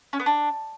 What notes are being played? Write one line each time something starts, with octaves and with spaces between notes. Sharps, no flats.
C#4
B3
D4